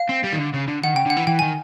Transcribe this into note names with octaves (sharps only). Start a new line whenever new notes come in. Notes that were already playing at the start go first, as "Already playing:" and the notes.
Already playing: F5
C4
G3
D#3
D3
C#3
D3
D#3 F#5
C#3 G5
D3 F#5
E3
E3 G5
D#3 G#5